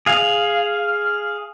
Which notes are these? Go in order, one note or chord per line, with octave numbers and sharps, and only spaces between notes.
G#4 F5